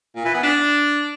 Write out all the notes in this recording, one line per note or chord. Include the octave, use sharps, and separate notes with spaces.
A#2
E3
B3
D4